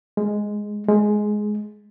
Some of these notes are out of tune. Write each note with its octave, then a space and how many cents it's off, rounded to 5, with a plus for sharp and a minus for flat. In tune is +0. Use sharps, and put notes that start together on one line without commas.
G#3 +0
G#3 +10